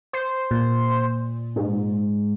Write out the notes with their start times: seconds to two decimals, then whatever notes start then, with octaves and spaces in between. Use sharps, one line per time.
0.13 C5
0.51 A#2
1.56 G#2